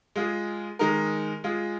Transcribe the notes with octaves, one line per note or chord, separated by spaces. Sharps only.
G#3 F4 G#4
D#3 G#3 D#4 A#4
G#3 F4 G#4